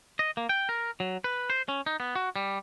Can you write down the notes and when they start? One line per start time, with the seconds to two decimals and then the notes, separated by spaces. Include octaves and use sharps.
0.19 D#5
0.37 A#3
0.49 G5
0.69 A#4
1.00 F#3
1.24 B4
1.50 C5
1.69 C#4
1.86 D#4
2.00 B3
2.15 F#4
2.36 G3